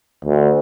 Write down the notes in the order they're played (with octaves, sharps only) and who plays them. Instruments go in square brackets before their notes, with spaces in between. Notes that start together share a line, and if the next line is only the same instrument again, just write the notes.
[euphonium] D2